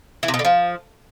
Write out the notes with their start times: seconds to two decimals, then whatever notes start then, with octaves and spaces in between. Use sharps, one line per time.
0.23 E3
0.28 C3
0.34 B2
0.39 D3
0.45 F3